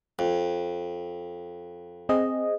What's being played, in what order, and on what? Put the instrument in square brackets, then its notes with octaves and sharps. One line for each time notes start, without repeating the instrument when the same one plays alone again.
[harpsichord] F2
[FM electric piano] C4 G#4 D#5